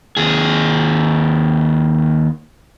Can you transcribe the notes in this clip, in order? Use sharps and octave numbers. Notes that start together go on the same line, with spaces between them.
D#2 G#4